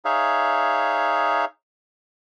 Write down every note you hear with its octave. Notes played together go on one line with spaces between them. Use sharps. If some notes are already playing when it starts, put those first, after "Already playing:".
D#4 G#4 C#5 E5 F5